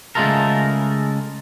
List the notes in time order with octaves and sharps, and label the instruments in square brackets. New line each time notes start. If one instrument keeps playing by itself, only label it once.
[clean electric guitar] C#3 G#3 A3 F4 A4 A#4